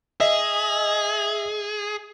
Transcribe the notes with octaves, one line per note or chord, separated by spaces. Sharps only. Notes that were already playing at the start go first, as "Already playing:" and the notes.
G#4 D#5 E5